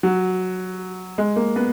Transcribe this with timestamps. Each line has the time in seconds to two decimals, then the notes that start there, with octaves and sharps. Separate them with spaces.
0.03 F#3
1.18 G#3
1.36 A#3
1.56 B3